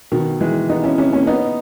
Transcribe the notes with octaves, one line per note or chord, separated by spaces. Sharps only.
B2 D#3
E3 G#3
B3 D#4
C#4 E4
C#4 E4
A#3 C#4
B3 D#4